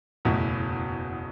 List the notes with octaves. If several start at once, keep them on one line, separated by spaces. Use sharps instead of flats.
F#1 E2 B2 A3 E4